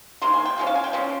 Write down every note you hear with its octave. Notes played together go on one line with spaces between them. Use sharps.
C3 D#3 A#3 C6
G#5
G5
F3 G#3 C#4
F5
G#5
G5
F3 G#3 C#4